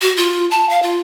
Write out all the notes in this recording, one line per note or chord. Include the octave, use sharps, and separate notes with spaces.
F#4
F4
A5
F5
F4